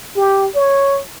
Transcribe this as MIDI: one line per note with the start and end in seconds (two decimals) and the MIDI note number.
0.16 0.47 67
0.55 0.99 73